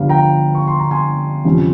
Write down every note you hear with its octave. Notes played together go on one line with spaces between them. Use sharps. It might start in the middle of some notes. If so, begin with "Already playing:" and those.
Already playing: G1 G2 F3 F5
G5 A#5
C#6
C6
A#5
G#5 C6
G1 F2 C3 G3 C#4